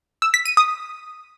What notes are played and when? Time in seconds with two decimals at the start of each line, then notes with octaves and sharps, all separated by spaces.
0.22 E6
0.34 B6
0.46 D#7
0.57 D#6